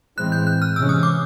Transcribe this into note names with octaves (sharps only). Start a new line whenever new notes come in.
A2 E3 G#3 C4 F#6
G6
F#6
F6
C3 E3 G#3 C#4 E6
D#6
D6